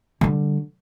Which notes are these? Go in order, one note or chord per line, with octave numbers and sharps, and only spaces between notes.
D3 G3